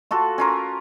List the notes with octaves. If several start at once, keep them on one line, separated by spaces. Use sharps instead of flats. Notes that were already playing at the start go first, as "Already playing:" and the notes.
F4 F#4 A4
C#4 F4 A#4